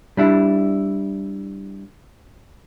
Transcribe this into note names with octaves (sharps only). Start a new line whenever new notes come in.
G3 D4 E4